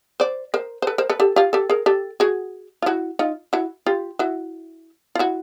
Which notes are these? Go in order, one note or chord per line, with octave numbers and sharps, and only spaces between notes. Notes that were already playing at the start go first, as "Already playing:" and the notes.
C5 D5
A#4 C5
C5
A4 B4
A#4 C5
A4 B4
G4 A4
F4 G4
G4 A4
G#4 A#4
G4 A4
F#4 G#4
F4
E4 F#4
D#4 F4
E4 F#4
F4 G4
E4 F#4
F4
E4 F#4